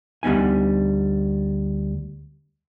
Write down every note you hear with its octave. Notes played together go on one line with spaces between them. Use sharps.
D2 G3 B3 D#4 G#5